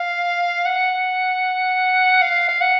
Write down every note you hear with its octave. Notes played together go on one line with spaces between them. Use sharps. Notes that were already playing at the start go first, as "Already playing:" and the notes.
Already playing: F5
F#5
F5
F5
F#5